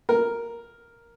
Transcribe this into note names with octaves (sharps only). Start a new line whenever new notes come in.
A#4